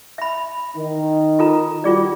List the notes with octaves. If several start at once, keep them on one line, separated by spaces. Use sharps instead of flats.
E5 B5
D#3
F4 A4 A#5
G3 F4 F#4 G#4 D5